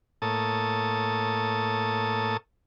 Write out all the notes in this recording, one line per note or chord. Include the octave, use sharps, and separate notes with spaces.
A2 A#3 A4 C#5 A5 D#6